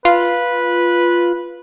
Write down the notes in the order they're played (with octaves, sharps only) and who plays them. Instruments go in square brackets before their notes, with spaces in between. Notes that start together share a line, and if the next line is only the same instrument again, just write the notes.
[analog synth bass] F4 [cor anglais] B4